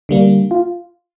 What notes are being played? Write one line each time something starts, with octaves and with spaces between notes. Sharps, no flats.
D3 G3 A#3
F4